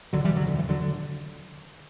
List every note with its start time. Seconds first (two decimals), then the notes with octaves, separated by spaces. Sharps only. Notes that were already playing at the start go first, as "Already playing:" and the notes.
0.13 C#2 D3 F#3
0.24 E3 G3
0.29 B2
0.36 D3 F#3
0.46 E2 D3
0.59 E3
0.64 C#3
0.69 D3 F#3
0.81 D3